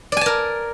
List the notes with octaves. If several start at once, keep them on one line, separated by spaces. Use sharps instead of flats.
A#4 D5 G#5 A5